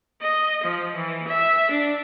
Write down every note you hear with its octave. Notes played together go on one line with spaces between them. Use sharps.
D#5
F3
E3
E5
D4